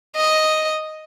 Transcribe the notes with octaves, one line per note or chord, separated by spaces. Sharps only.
D#5